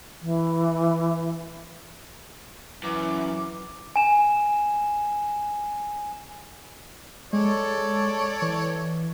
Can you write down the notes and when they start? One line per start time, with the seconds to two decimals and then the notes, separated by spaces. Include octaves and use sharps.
0.22 E3
2.83 F#2 E3 D6
3.96 G#5 E7
7.33 G#3 A4 C#5 D5
8.42 E3